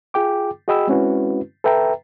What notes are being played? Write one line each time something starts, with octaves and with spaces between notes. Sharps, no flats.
F4 G#4 G5 D6
F#4 G#4 D#5 G5 B5 E6
G#3 C4 C#4 E4 F#4 B4
A4 B4 E5 G5 A#5